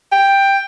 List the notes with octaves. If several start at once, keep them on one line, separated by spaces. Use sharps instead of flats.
G5